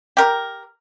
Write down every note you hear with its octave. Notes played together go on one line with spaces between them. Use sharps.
G4 A#4